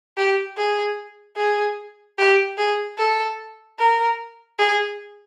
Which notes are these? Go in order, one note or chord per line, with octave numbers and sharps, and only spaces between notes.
G4
G#4
G#4
G4
G#4
A4
A#4
G#4